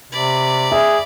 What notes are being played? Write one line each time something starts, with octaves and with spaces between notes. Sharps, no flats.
C3 D5 B5
G#4 E5